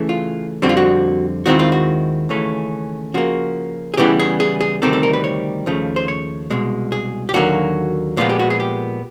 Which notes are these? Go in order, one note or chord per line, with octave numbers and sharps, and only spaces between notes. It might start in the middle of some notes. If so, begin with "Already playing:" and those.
Already playing: C#3 E3 A3
F4
F2 D3 G3 C4 F#4
F4
F#4
D#2 D#3 G#3 C4 E4 F#4
F4
F#4
D#2 C#3 E3 A3 C#4
C#3 F3 A#3 F#4
G#4
C#3 E3 G3 B3 E4 G4
G#4
G#4
G#4
D2 C3 D#3 G3 C4 A4
A4
A#4
B4
C#5
D#2 C#3 F3 A3
C5
C#5
C2 B2 G#3
G#4
G4
D#2 D3 F#3 A#3 F#4
A#2 F3 G#3 B3 F4
G4
F#4
G#4
G4